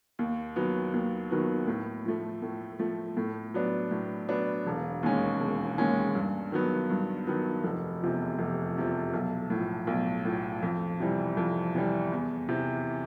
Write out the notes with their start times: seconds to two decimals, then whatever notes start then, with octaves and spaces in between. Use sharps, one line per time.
0.19 D#2
0.56 D#3 F#3 B3
0.94 D#2
1.31 D#3 F#3 B3
1.67 A2
2.05 F3 A3
2.42 A2
2.79 F3 A3
3.17 A2
3.54 F#3 B3 D4
3.91 A2
4.29 F#3 B3 D4
4.66 E1
5.03 D#2 D#3 G#3 C#4
5.40 E1
5.78 D#2 D#3 G#3 C#4
6.15 G2
6.52 D#3 F#3 B3
6.90 G2
7.27 D#3 F#3 B3
7.64 F1
8.01 E2 C3 F3
8.39 F1
8.76 E2 C3 F3
9.14 B1
9.50 A2 F3
9.87 B1
10.25 A2 F3
10.62 F2
11.00 C3 E3 G3
11.37 F2
11.75 C3 E3 G3
12.12 E2
12.49 C3 E3